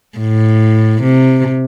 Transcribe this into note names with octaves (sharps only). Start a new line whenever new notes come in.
A2
C3